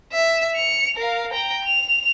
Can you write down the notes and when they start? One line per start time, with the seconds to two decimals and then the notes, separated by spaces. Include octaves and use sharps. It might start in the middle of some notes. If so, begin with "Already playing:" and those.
0.12 E5
0.55 C#7 F7
0.97 A#4 F5
1.33 G5 A#5
1.65 F7